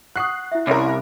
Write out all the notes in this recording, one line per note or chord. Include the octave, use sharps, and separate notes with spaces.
F#5 C#6 D#6 F#6 C7
E4 E5
C2 C#4 A#4
F5 B5